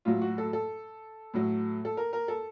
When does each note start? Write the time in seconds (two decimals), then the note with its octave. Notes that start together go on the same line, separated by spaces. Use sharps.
0.05 A2 F#3 F4
0.22 F#4
0.38 A4
0.53 A4
1.34 A2 F#3
1.85 A4
1.97 A#4
2.13 A#4
2.28 A4